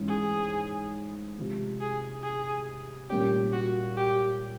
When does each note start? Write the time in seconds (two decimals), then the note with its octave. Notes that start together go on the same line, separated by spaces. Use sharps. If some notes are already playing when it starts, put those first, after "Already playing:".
Already playing: G#2 E3 G#3 C#4
0.08 G#4
1.38 C3 F3 G#3
1.81 G#4
2.23 G#4
3.10 A#2 G3 A#3 C#4 G4
3.53 F#4
3.97 G4